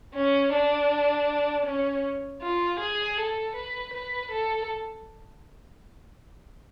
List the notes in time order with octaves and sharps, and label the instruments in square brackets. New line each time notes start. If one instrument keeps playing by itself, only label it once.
[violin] C#4
D4
C#4
F4
G#4
A4
B4
B4
A4